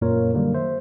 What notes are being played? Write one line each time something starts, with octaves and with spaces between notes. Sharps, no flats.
F#2 A#2 A#3 F4 A#4 C#5
D3 D#3 F#3 G3 A#3
C5 E5